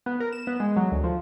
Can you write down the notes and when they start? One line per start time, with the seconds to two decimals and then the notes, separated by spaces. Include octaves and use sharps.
0.06 B3
0.20 A#4
0.33 E7
0.47 B3
0.60 G#3
0.76 F#3
0.92 D2
1.04 F3